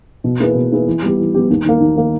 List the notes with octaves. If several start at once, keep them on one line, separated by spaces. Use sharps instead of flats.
B2
A#3 E4 G#4 B4
B2
A#3 E4 G#4 B4
E3
G3 B3 G4
E3
G3 B3 G4
D#2
D#3 A#3
D#2
D#3 A#3